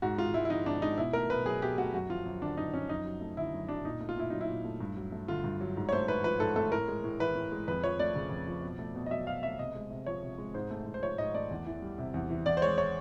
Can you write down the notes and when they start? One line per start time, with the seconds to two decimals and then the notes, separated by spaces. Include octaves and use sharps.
0.02 G#2 F#4
0.18 G#3 F4
0.34 G#2 E4
0.45 E4
0.50 F3 D#4
0.66 G#2 D4
0.82 G#3 D#4
0.98 B2 E4
1.13 A3 A#4
1.30 B2 B4
1.45 F#3 G#4
1.62 B2 G4
1.78 A3 F#4
1.93 F#2 F#4
2.09 F3 F4
2.25 F#2
2.42 D3 D4
2.57 F#2 D#4
2.73 F3 C#4
2.89 F#2 D#4
3.05 F#3
3.21 A3
3.37 D3 E4
3.53 F#2
3.68 F#3 D4
3.85 A#2 D#4
4.01 A3
4.09 F4
4.17 A#2 E4
4.30 F#3 D#4
4.41 E4
4.48 A#2
4.65 A3
4.80 G2
4.96 F#3
5.12 A3
5.28 D3 F4
5.44 G2
5.61 F#3
5.77 G#2
5.89 C#5
5.92 A3 C5
6.08 G#2 B4
6.24 F3 B4
6.40 G#2 A4
6.56 A3 A4
6.72 A2 A#4
6.88 G#3
7.04 A2
7.20 E3 B4
7.35 A2
7.52 G#3
7.68 F2 B4
7.84 F3 C#5
7.99 A3 D5
8.15 C#3
8.31 F2
8.47 F3
8.63 B2
8.79 A3
8.95 B2
9.06 D#5
9.11 F#3 E5
9.27 B2 F5
9.43 A3 E5
9.59 C3 D#5
9.75 G#3
9.91 C3
10.06 F3 C#5
10.23 C3
10.38 G#3
10.54 G#2 C5
10.71 A3
10.86 G#2
10.94 C5
11.02 F3 C#5
11.18 G#2 D#5
11.34 A3 D5
11.51 E2
11.66 E3
11.82 G3
11.99 C3
12.14 E2
12.30 E3
12.46 E2 D5
12.57 C5
12.62 G#3 C#5
12.78 C#5